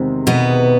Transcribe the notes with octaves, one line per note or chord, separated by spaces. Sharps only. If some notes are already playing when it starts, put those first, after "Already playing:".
Already playing: E2 C3 D#3 G#3 C4
B2 B3